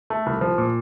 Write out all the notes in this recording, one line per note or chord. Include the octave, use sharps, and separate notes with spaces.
A3
C2
F3
A#2